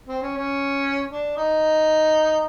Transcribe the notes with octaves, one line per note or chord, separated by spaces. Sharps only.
C4
C#4
C#4
D4
D#4